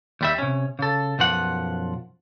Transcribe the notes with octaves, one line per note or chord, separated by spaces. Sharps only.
D#2 G3 E5
C3 C#4
C#3 A4
B1 F#2 F3 F#5